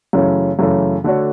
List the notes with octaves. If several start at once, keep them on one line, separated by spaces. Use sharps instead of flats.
F#2 C#3 E3 A3 C#4
F#2 C#3 E3 A3 C#4
D3 A3 D4 F#4 C#5